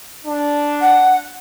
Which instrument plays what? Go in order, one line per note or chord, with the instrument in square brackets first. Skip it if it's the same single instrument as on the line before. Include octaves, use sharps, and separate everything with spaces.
[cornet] D4
[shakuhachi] F#5